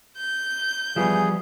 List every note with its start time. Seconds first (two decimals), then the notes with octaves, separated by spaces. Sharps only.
0.17 G6
0.96 E3 F3 G3 B3 G#4